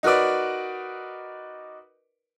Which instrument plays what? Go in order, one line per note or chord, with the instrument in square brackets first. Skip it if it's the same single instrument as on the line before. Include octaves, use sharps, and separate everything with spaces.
[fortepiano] D#4 F#4 A#4 B4 D5